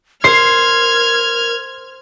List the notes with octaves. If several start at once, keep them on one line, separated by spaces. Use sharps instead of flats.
A#4 C5 F6 G#6 C7